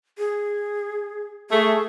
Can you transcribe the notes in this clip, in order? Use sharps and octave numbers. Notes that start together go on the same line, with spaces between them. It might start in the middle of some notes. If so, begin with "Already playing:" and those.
G#4
A3 G#4